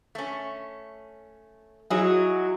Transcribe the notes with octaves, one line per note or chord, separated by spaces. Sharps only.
A3 C#4
F#3 D#4 E4 G#4